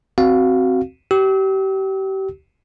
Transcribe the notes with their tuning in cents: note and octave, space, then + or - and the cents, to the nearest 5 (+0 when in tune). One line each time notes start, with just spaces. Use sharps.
C4 +0 F#4 +10 F5 +5
G4 -30 E6 -40